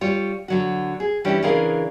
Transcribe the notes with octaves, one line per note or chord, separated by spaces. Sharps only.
G3 F4 C#5
D3 F#3 F#4
G#4
E3 G3 C#4 D4 E4 G4
C#3 E3 D4 G#4 A#4 F5